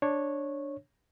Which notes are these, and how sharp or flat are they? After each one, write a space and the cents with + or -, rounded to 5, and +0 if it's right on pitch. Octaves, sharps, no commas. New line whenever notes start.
D4 +0 C#5 -10